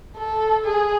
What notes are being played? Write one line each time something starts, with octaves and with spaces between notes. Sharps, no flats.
A4
G#4